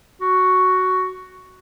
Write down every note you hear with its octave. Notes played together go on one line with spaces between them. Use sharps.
F#4